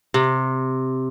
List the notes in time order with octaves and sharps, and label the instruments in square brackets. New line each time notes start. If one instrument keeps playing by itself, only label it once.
[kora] C3